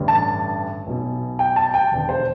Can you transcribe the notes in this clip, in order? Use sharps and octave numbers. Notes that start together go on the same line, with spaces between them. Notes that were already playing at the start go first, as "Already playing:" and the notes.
Already playing: A1 G2 D3
A5
B1 B2
G5
A5
G5
E1 E2 D3
C5